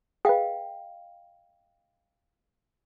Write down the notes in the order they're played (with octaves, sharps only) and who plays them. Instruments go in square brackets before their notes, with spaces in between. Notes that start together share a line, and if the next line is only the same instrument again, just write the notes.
[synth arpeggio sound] G#4 B4 [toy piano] D#5 F5 G5